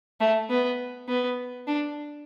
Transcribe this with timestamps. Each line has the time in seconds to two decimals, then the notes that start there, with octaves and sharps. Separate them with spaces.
0.20 A3
0.50 B3
1.08 B3
1.67 D4